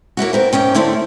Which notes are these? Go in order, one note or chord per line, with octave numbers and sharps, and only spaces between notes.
A#3 C#4 E4 F#4
B3 C4 A#4
D#2 G#2 C#4 G5
D3 A3 C4 E4